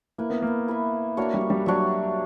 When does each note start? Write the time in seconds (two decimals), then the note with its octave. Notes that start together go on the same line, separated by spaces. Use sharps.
0.18 A#3 E4 B4 E5
0.30 B3
0.42 A#3
0.68 E4 B4 E5
1.17 A#3 D4 F#4 C#5 E5
1.34 G3
1.50 G3
1.66 F#3 D4 F#4 C#5 E5